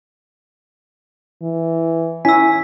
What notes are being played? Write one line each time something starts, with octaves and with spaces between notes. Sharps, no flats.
E3
C#4 E4 G#5 E6 B6